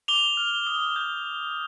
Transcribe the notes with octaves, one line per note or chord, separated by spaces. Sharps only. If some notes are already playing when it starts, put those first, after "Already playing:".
D6 F7 G7
F6
D#6
G6